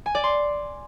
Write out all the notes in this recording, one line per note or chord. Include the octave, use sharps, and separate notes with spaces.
G#5
D5
C6